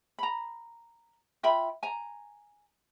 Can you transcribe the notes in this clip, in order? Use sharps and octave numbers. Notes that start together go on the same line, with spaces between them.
A#5 B5
F4 E5 G5 B5
G#5 A#5